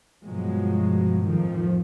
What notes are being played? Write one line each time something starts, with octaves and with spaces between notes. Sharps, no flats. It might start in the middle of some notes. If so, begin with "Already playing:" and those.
G2 B2 F3 F#3 G#3
F2 A2 D#3 F3